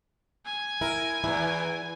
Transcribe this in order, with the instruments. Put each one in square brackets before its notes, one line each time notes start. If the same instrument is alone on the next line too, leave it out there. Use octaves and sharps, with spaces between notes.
[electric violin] G#5
[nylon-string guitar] E4 [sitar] A#4
[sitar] E2 [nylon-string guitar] E3 E4